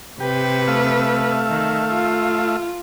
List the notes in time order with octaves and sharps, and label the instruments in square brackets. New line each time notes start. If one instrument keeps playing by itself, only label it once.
[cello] C3 B4 [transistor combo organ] G4
[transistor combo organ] A3 E5 F5
[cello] D#3
F4